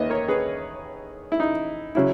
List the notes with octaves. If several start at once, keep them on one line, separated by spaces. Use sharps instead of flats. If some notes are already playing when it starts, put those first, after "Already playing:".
Already playing: D#2 D#3 A#3 B4 D#5 E5
A#4 C#5
G#4 B4
E4
D#4
C#3 F#3 E4